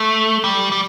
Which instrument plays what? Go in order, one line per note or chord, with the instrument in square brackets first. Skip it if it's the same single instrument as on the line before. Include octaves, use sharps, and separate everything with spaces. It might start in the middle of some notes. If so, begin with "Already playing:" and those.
Already playing: [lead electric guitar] A3
G3
G3